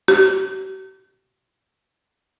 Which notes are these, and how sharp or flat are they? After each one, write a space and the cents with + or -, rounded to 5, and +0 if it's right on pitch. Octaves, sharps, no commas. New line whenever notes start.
G4 -40